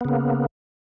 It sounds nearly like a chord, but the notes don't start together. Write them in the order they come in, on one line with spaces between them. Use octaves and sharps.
B3 C#3 A#3